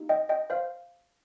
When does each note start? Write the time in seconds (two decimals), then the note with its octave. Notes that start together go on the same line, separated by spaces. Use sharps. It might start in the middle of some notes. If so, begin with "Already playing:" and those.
Already playing: A#3 D#4 G4
0.09 D#5 G5
0.29 D#5 G5
0.50 C5 F5